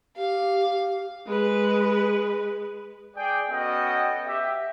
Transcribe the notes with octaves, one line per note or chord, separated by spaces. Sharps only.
G4 F5
G#3 B4
G#4 D5 G5
B3 C#4 F#4 A4 D#5 G5
G4 E5